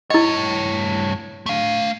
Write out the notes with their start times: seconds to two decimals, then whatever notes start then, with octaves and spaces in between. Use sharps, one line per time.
0.10 G2 E4 C#5 D#5
1.46 A3 F5